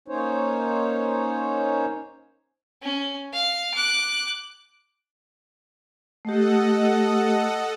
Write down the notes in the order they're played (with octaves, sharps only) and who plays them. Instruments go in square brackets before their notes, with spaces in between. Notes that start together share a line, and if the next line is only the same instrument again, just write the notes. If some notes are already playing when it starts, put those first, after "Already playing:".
[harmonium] A#3 C#4 D#4 C5 C#5
[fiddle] C#4
F5
D6 F#6
[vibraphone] A3 G4 [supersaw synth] A4 D#5 F#5